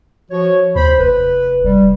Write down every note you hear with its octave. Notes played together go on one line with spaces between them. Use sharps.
F3 F#4 C#5
D#2 C5 B5
F1 B4
F1 G3